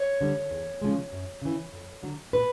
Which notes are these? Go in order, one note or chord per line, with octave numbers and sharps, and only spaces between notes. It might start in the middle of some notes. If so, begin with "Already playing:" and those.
Already playing: C#5
D3 G3
E2
C#3 F3 G#3
F#2
C#3 E3
F2
D3 F#3
A#2 B4